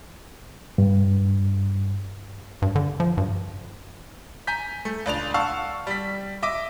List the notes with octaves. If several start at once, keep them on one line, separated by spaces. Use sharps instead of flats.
G2
G2
D3
F3
G2
G#5 A#5 G6 B6
A3
C#2 D4 D5 F7
F5 F#5 A5 C#6 E6
G3 B6
D#5 E5 D6